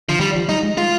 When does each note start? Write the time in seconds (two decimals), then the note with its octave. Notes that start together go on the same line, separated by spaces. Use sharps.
0.09 D3 F3
0.19 D#3 G3
0.35 F3
0.49 G3 D#4
0.63 G#3
0.77 G#3 F4